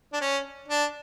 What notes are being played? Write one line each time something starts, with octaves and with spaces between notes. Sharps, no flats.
D4
C#4
D4